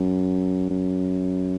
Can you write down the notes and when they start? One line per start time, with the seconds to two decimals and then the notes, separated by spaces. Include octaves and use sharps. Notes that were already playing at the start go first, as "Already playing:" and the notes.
Already playing: F#2
0.70 F#2